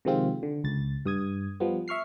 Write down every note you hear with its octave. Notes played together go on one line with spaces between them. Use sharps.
C3 D#3 F3 G#3 C4 F4
D3
C#2 A6
G2 D#6 G#6
F3 G3 B3
E5 C#6 F6 C7